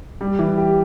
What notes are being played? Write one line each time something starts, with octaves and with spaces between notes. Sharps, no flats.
G3
E3
G4